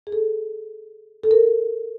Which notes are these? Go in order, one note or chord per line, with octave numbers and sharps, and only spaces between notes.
G#4
A4
A4
A#4